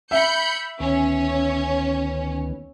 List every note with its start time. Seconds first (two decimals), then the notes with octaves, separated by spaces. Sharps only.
0.11 E5 B5 G6 C#7
0.80 D2 D#3 B3 C#4